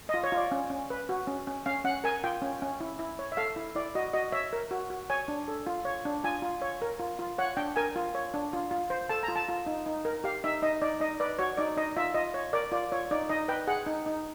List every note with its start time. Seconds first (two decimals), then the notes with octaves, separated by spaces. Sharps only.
0.09 F4 D#5
0.24 C#5
0.32 F4
0.37 D5
0.52 C#4
0.70 C#4
0.90 B4
1.09 F#4
1.27 C#4
1.47 C#4
1.66 C#4 F5
1.84 C#4 F#5
2.04 A#4 G#5
2.24 F4 G5
2.42 C#4
2.62 C#4
2.81 E4
2.99 E4
3.19 C#5
3.32 E5
3.37 A4 F5
3.56 E4
3.75 E4 D5
3.95 F#4 D#5
4.13 F#4 D#5
4.32 C#5 E5
4.53 A#4
4.71 F#4
4.90 F#4
5.10 C#5 G#5
5.28 D4
5.48 A4
5.67 F4
5.85 C#5
6.05 D4
6.24 F4 G#5
6.42 F4
6.62 C#5
6.82 A#4
6.99 F4
7.19 F4
7.38 C#5 F#5
7.57 D4 G5
7.76 A#4 G#5
7.96 F4
8.15 C#5
8.34 D4
8.53 F4
8.71 F4
8.90 C5
9.09 A4 A5
9.23 A#5
9.28 F4
9.36 A5
9.49 F4
9.66 D#4
9.86 D#4
10.05 A#4
10.24 G4 F5
10.44 D#4 E5
10.62 D#4 D#5
10.82 D#4 D5
11.00 D#4 D#5
11.20 B4 D5
11.39 F#4 C#5
11.57 D#4 D5
11.77 D#4 D#5
11.97 F4 E5
12.14 F4 D#5
12.34 C#5
12.53 A#4 D5
12.72 F4 D5
12.92 F4 C#5
13.11 D#4 D5
13.29 D#4 D#5
13.48 B4 G5
13.67 G#4 F#5
13.86 D#4
14.06 D#4